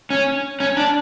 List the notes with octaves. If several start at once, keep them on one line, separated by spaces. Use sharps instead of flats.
C#4
C#4
D4